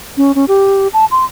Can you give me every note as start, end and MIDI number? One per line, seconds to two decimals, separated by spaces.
0.17 0.32 61
0.35 0.45 61
0.48 0.88 67
0.93 1.05 81
1.11 1.25 84